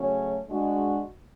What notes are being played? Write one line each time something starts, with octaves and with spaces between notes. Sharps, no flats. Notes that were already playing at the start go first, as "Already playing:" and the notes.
Already playing: C#3 F#3 A3 C#4
G#3 D4 F#4